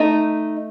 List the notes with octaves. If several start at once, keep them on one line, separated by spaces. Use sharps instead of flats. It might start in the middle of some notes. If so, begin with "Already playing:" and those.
Already playing: A3 D#4